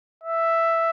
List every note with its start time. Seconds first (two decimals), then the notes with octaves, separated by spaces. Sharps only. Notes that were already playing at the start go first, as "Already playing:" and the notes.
0.23 E5